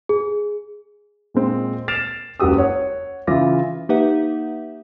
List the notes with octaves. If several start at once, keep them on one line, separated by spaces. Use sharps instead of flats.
G#4
A#2 G#3 C4
F6 A6 C7 D7 E7 F7
F#1 C#2 F#4 G4 D#6 E6
C#5 F#5
C#3 E3 F4 E5 D6 A#6
A#3 D#4 G4 B4 E5 F#5